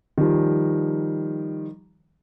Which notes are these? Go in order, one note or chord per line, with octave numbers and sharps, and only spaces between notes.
D#3 F3 G3